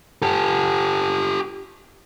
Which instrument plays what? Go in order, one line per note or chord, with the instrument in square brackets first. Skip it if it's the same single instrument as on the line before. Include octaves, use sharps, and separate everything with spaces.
[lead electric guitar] G4 A4